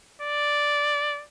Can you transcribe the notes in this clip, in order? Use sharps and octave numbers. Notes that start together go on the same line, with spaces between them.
D5